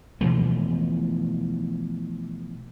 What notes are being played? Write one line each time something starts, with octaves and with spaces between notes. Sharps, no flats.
B2 E3 F3 A3